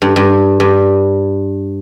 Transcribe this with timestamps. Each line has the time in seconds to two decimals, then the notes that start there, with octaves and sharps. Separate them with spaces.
0.02 G2
0.16 G2
0.60 G2